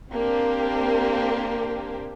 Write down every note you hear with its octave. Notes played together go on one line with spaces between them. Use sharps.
A#3 C4 D4 G4